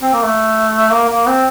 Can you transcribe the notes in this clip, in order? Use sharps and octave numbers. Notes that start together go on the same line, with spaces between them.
C4
A#3
A3
A#3
A#3
C4